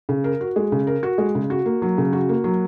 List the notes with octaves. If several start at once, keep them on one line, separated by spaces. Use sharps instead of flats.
C#3
A#4
F#4
G#3
C#3
A#4
F#4
G#3
C#3
F#4
A#3
F#3
C#3
F#4
A#3
F#3